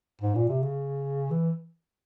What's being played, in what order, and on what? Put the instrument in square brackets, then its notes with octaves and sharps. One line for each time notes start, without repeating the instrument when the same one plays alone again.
[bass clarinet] G#2
A#2
C3
C#3
E3